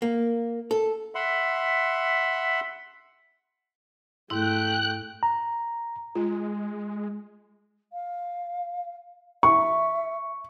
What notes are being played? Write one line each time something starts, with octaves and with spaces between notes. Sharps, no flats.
A#3
A4
E5 F#5 B5 C6
G#2 A3 E4 G5 F#6
A#5
G#3 F4
F5
E5 C#6